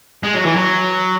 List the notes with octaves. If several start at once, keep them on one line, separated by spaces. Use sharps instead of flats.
G#3
F#3
E3
F#3